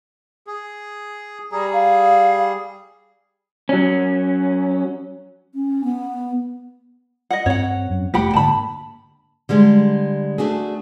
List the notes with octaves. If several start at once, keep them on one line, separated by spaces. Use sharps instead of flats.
G#4
G3 G#4 A#5
F5
F#3 C#4
C#4
B3
D#5 F#5
G2 C4 C#5 F#5
F#2
F1 A3 A#3 G4 F#5 B5
G#2 D3 A#3 A5 B5
D3 G3 G#3
A3 D4 F#4 G#4